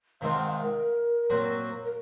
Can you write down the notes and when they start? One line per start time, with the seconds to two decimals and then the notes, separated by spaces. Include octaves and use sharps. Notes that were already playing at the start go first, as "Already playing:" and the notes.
0.21 C3 D#3 G#3 C4 F4 F5
0.34 F#5
0.48 F5
0.61 A#4
1.30 A#2 F#3 C4 F#4
1.84 A#4